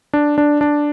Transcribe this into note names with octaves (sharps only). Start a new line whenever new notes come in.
D4
D4
D4